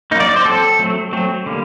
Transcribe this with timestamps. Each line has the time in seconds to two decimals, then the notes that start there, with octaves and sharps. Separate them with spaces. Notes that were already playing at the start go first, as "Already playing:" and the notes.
0.11 A#3 D#4
0.15 F#3 D5
0.29 D5
0.36 C5
0.45 F#3 C4 A4
0.79 F#3 A3 C4
1.13 F#3 A3 C4
1.46 D3 G3 A#3